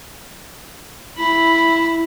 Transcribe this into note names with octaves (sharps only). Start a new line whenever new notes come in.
E4 B5